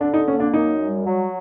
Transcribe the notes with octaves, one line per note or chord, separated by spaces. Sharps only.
D3 D4
D#4
A#3 C#4
D4
F#2 D#4
G3
F#3